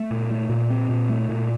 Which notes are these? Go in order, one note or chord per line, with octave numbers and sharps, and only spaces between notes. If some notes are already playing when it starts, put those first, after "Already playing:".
Already playing: A3
A#2
A3
A#2
C4
A#2
A3
A#2